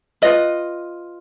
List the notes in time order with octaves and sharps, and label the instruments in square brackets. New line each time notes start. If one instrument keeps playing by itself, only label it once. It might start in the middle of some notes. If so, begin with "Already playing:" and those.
[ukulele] F4 B4 D#5